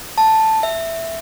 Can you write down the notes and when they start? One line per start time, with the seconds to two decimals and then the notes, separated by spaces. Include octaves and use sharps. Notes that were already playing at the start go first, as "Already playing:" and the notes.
0.18 A5
0.63 E5